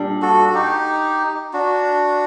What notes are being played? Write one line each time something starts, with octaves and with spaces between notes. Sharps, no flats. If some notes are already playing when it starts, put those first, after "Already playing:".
Already playing: A#2 G3 D4
F#4 A4
F#4
D#4 G4
D4 F#4